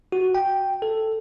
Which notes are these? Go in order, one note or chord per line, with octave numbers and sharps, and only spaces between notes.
F#4
G5
A4